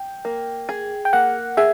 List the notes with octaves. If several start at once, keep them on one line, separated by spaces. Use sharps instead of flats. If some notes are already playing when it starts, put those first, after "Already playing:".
Already playing: G5
A#3
G#4
G5
A#3 F#5
G#4 E5